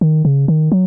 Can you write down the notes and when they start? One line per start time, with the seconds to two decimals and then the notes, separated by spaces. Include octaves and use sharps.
0.01 D#3
0.25 C#3
0.48 D#3
0.72 F#3